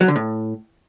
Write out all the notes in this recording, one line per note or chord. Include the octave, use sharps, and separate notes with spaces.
F#3
D3
A2